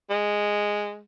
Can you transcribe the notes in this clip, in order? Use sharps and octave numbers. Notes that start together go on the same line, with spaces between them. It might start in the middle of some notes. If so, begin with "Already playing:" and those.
G#3